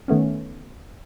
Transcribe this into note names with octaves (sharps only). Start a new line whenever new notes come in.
D#3 A3 B3 C#4